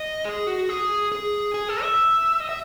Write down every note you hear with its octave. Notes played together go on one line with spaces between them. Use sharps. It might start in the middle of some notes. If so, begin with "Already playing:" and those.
Already playing: D#5
G#4
F#4
G#4
G#4
G#4
A4
E5
D#5
E5